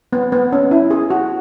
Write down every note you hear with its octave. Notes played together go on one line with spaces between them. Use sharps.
B3
B3
C#4
E4
G#4
F#4